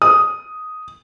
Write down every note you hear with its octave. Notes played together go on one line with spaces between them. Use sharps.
D#6